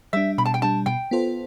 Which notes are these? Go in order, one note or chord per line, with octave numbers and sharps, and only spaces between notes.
G3 D4 E5
B2 B5
A5
G5
G3 D4 A5
B2 G5
B3 F4 A4 C5